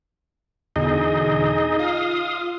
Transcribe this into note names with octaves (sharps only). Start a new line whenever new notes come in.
E2 B2 D3 D#4 G#4 D#5
F4 F5 D#6